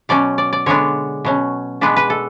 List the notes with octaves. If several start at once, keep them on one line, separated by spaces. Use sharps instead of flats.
B2 F#3 C#4 D5
D5
D5
D3 G#3 B3 D4 C#5
B2 F#3 C#4
B2 G#3 B3 D4 B4
B4
A4